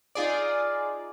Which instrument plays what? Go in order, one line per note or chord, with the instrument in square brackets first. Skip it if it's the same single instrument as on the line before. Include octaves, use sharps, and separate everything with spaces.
[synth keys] D#4 F4 G#4 D5